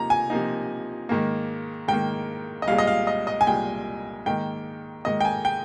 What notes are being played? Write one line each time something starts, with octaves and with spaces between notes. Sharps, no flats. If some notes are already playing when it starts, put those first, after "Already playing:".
Already playing: C3 F3 A#3 D#4 A#5
G#5
C3 F3 A#3 D#4
G#2 D#3 A#3
G#2 D#3 A#3 G5
D#5
C2 A#2 G#3 F5
D#5
F5
D#5
D#5
G#5
C2 A#2 G#3 G5
G#2 D#3 A#3 G5
G#2 D#3 A#3 D#5
G5
G#5
G5